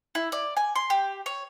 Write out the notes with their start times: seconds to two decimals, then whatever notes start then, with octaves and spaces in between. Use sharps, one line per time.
0.15 E4
0.32 D5
0.57 G#5
0.75 C6
0.90 G4
1.26 C#5